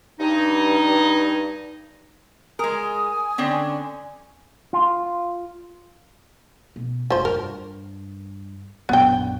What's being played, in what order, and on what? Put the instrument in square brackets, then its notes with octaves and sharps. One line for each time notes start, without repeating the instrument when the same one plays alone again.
[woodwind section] G2 D#4
[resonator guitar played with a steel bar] G#3 A#4 [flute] G#5 [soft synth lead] D#6
[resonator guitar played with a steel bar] D3 C4 C#4
[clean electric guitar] F4
[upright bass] B2
[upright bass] F1 [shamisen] F3 C5
[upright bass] G2 [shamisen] A#4
[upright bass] A#1 F#2 [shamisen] B3 G5